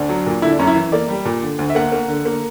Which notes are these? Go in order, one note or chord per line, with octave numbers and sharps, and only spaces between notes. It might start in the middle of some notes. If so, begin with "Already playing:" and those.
Already playing: D2 D4
F#3
A#2
D3 E4
D4
F#2 C#4
E4
E3
A#3 D5
G3
A#2
D3
D2
E5
A#3 F#5
A#3
D3
A#3